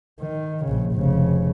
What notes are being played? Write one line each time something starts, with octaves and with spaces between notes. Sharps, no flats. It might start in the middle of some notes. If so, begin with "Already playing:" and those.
D#3
A#1 C#3
F1 C#3